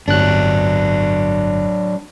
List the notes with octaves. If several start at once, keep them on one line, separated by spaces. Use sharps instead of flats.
G1 F#3 D4 F#6